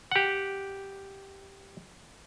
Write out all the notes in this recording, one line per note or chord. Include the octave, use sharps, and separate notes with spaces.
G4 F#5